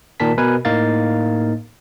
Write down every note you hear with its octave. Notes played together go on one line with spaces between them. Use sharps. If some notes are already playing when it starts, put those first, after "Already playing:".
A#2 D#3 A#4 A5 B6
B2 A#4 B4 G#5
A2 A#3 D#4 F5 A6